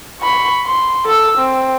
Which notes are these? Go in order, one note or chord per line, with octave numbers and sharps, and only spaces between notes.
B5 C#6
C6
A4 E6
C4